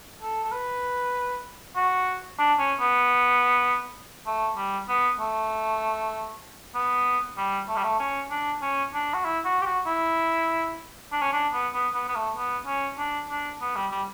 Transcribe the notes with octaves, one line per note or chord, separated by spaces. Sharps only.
A4
A4
B4
F#4
D4
C#4
B3
A3
G3
B3
A3
B3
G3
A3
G3
A3
C#4
D4
C#4
D4
F#4
E4
F#4
G4
F#4
E4
D4
C#4
D4
B3
B3
B3
B3
A3
B3
C#4
D4
D4
B3
G3
G3